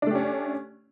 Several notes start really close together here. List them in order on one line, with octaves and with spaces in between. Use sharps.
D4 A3 G4 C#4